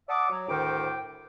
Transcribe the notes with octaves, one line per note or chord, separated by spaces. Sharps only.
D5 E5 F#5 A5 D6 D#6
F#3
D2 A2 D#3 C5 G5 D6